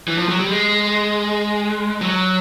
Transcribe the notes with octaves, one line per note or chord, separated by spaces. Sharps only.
E3
F3
F#3
G3
G#3
F#3